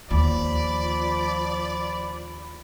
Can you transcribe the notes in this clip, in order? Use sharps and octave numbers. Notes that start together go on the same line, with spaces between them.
D#2 F3 D5 B5